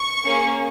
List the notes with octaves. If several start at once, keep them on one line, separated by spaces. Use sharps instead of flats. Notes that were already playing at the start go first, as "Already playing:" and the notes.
Already playing: C#6
A#3 C#4 G#4